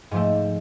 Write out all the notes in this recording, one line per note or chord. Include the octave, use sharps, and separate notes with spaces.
G#2 F3 A3